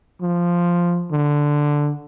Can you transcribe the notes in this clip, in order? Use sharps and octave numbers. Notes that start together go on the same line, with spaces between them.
F3
D3